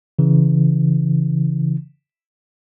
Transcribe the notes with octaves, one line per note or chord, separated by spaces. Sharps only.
C#3 E3